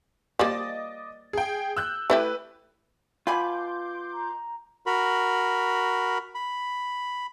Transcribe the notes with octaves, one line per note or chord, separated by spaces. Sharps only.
F3 G3 A#3 D#5 D6 A6
G#4 G5
E6 F#6 G6
A3 E4 G4 B4
B2 F4 G#5 B5 C6 D6 G6
A#5
F#4 A#4 B5
B5